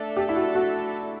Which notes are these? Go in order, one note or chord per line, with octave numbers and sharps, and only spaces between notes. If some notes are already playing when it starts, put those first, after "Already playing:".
Already playing: A3 D4 A4
G4
E4
F#4
F#4